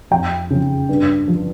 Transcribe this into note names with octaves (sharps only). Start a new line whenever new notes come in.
F2 G5
C#3 F3
G2
F3